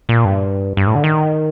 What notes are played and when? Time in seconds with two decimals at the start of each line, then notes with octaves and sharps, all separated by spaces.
0.09 A#2
0.25 G2
0.77 G2
0.87 A2
0.95 D3
1.04 D#3